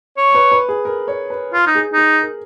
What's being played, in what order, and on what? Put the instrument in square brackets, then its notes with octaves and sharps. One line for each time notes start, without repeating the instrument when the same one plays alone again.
[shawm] C#5
[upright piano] B4
B4
G#4
A#4
C#5
B4
[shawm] F4
D#4
[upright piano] G#4
[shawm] D#4 [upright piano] G#4
[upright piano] A#4